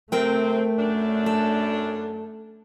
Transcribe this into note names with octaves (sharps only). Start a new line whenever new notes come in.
C3 A3 C4 A#4 G5
F#2 D4
A4